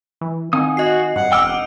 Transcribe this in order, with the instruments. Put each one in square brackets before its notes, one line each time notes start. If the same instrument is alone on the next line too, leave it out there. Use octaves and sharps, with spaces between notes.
[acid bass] E3
[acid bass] D#3 [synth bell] C4 [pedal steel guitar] F#5 G#5 D#6
[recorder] F#4 [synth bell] D#5 C7
[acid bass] G2 [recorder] F#5
[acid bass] E1 [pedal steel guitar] G5 E6 F6 [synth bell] D6 D7 G7
[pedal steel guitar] D#4 [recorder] F#5